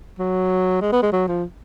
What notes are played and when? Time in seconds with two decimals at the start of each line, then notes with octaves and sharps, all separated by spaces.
0.19 F#3
0.81 G#3
0.92 B3
1.02 G#3
1.12 F#3
1.27 F3